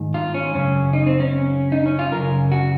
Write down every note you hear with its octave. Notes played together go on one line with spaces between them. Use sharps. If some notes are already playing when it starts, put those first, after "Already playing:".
Already playing: G#2 D#3
F4
C#4
F#2 C#3 C#4
D#4
C4
C#4
D#4
C#4
F4
F#2 C#3 A#4
F#4